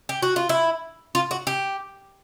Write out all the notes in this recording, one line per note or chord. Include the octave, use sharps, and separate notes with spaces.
G4
F#4
F4
E4
F4
F#4
G4